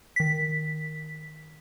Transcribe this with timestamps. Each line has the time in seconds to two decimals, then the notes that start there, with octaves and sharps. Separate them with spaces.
0.16 D#3 B6